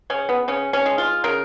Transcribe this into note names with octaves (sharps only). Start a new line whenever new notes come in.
C#3 C#4
B3
C#3 C#4
C#4
G#3
F4
C#3 A#4